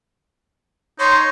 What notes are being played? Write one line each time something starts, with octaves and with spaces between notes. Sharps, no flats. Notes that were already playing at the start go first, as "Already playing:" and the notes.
D#4 C#5 C6